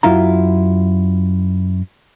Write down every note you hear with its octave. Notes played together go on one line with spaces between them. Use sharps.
F#2 E4 F4 A#5